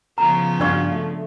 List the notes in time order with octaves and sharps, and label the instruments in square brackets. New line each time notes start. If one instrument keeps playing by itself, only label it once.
[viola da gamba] C#3 F3 B3 [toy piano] A#5
[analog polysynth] G2 F#4 F5 [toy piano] D4 D5 C#6
[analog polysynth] A3